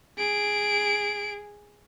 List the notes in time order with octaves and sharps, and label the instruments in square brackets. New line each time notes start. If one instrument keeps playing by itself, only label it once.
[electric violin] G#4 D7